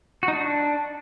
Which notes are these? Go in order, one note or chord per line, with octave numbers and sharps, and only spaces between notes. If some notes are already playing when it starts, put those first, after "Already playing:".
F#4
D#4
D4